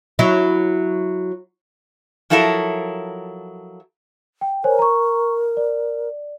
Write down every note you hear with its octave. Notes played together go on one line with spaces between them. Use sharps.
F#3 E4
F3 F#3 E4 A4 A#4
G5
A#4 C5 C#5 G#5
A#5 C#6
D5